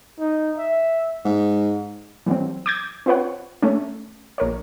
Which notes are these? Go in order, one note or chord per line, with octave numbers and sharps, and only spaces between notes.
D#4
E5
G#2
E3 F#3 G3 C4
D6 G6 G#6
C4 F4 B4 C#5 F#5
A3 C#4
A#1 A#4 C#5